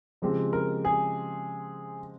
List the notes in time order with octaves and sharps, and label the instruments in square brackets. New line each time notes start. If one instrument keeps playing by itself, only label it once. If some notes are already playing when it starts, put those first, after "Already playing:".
[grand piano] C#3 F3 G#3 C4 G4
[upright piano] A#4
G#4